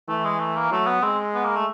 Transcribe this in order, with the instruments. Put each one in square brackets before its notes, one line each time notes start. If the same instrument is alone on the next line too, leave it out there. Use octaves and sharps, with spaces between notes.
[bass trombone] E3 [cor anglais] A3
[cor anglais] G#3
A3
A#3
[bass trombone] F#3 [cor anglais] A3
[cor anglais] B3
[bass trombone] G#3 [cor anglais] C4
[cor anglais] B3
A#3
A3